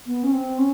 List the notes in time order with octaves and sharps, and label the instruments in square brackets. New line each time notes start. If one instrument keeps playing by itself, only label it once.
[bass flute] B3
C#4
C4
C#4